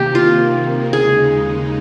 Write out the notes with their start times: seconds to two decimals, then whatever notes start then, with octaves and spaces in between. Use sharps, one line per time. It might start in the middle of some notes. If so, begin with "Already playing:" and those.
Already playing: C3 D#3 A#3 G4
0.15 F4
0.93 D#2 C#3 G#3 D#4 G#4